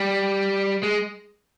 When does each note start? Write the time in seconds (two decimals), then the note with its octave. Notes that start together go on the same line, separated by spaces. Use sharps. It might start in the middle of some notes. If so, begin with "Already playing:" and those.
Already playing: G3
0.83 G#3